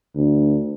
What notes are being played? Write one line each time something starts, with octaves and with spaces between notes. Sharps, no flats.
D2